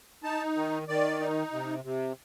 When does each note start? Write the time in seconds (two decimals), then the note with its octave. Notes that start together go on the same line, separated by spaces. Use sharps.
0.23 D#4 A5
0.56 D#3
0.88 D#3 D5
1.20 D#4
1.53 C3
1.84 C3